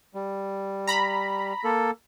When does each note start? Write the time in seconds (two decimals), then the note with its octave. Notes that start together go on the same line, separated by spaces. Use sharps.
0.15 G3
0.87 A#5 B5
1.64 A#3 A4